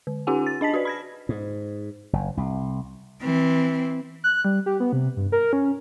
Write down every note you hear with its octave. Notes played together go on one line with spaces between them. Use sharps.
D3
C#4 D#4 F4 G4 F#5 G#5
A6
D4 D#5 A5 B6
F#4 B4 D5
B5 G#6 A#6
G#2
F#1
C2
E3 C4
F#6
G3
G4
B3
C3
G2
A#4
C#4